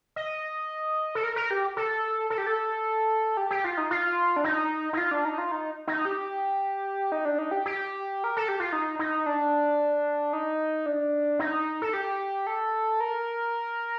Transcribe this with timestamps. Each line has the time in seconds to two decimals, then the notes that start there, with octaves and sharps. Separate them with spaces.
0.16 D#5
1.15 A4
1.23 A#4
1.36 A#4
1.51 G4
1.77 A4
2.30 A4
2.38 G4
2.47 A4
3.37 G4
3.50 G4
3.64 F4
3.78 D#4
3.91 F4
4.36 D4
4.44 D#4
4.93 D#4
4.97 F4
5.11 D4
5.25 D#4
5.38 F4
5.52 D#4
5.87 D#4
6.05 G4
7.12 D#4
7.25 D4
7.38 D#4
7.51 G4
7.66 G4
8.24 A#4
8.37 A4
8.48 G4
8.60 F4
8.73 D#4
8.99 D#4
9.26 D4
10.33 D#4
10.86 D4
11.39 D#4
11.82 A4
11.93 G4
12.47 A4
13.00 A#4